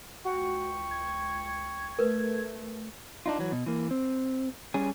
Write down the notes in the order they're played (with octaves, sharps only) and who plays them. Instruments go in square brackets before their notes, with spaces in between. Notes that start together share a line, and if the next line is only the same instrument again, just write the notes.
[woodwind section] C#2 G5 C#6 [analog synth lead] F#4
[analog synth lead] G#6
[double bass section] A3 [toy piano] A#4 B4
[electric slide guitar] D4 D#4 F4
E3 F#3
B2
E3 A#3
C4
G3 C#4 G#4